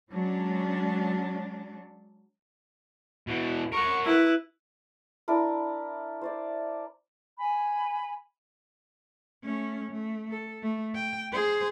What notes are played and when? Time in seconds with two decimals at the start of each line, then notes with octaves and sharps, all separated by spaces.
0.12 F#3 G#3 C#4 D4
3.27 B2 E3
3.73 A#4 F#5 C#6
4.05 E4 B4
5.28 D4 E4 A#4
6.21 C5 D5 E5
7.38 G#5 B5
9.44 A3 C#4
9.91 A3
10.30 A4
10.62 A3
10.95 G5
11.33 G#4 C5